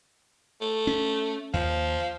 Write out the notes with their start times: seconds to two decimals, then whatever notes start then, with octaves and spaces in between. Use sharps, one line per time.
0.61 A3
0.87 C#4
1.54 D#2 F3